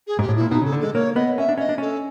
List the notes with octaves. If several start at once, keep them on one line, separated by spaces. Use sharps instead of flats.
G#4
G#2 G4
A2
A#2 E4
B2 D#4
C#3 A4
D3
G#3 A4
A#3 C#5
B3 D#5
C#4 E5
D4
C#4 D#5
D4
C#4 A4